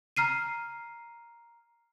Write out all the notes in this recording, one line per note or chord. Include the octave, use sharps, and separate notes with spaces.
A#5 F6 C7 D#7